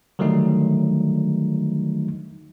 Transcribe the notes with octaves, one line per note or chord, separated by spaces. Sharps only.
D3 D#3 F#3 G3 A3 D#4